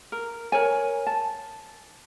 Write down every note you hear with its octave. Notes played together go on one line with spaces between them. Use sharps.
A#4
A#4 C#5 G#5
A5